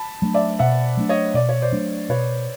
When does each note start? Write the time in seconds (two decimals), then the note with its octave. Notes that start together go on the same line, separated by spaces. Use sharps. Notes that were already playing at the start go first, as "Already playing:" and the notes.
Already playing: A5 B5
0.22 F#3 A3 D4
0.34 D5 E5
0.59 B2 E5 F#5
0.97 F#3 A3 D4
1.09 C#5 D#5
1.34 B2 D5
1.49 C#5
1.62 C5 D5
1.72 F#3 A3 D4
2.09 B2 B4 C#5